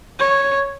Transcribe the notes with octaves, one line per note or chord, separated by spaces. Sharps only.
C#5